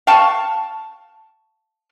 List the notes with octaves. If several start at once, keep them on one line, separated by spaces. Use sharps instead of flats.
F5 G5 A5 C#6